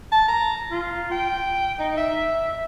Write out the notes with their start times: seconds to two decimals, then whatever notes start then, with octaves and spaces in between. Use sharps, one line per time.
0.12 A5
0.28 A#5
0.71 F4
1.12 G5
1.79 D#4
1.97 E5